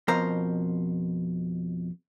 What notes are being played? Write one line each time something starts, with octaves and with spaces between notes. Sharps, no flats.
F2 B2 A#4 C5 A#5